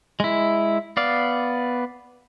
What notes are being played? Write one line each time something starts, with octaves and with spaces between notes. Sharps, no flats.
G#3 E4
B3 D5 F5